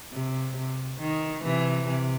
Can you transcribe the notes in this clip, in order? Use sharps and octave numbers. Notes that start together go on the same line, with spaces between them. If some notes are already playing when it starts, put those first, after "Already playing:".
C3
C3
D#3
C3 E3
C3